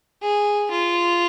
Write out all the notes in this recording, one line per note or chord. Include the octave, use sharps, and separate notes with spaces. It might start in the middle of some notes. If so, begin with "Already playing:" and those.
G#4
F4